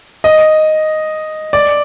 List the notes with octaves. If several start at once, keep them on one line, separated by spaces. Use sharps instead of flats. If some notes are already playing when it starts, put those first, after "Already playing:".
D#5
D5